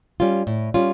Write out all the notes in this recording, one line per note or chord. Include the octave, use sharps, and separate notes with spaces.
G3 C#4 F4
A2
G3 C#4 F4